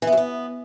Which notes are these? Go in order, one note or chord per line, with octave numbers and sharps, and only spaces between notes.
E3
B3
F#3
B3